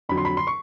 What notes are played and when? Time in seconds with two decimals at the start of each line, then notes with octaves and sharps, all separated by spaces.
0.09 F2 D3 F#3 B5
0.17 C6
0.25 B5
0.37 C6
0.47 C#6